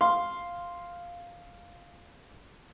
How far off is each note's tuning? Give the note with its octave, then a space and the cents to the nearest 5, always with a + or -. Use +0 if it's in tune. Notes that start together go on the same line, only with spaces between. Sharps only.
F5 +0 C6 +0